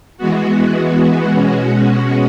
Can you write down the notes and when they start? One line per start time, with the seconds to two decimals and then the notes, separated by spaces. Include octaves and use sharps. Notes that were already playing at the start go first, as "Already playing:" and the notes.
0.17 E3 G#3 B3 F#4
1.32 B2 G#3 C#4 F#4